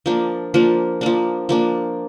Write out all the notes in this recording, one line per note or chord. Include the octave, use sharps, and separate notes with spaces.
F3 A#3 D4
F3 A#3 D4
F3 A#3 D4
F3 A#3 D4